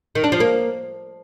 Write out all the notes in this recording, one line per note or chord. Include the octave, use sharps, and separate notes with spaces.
D#3
D4
F3
A#3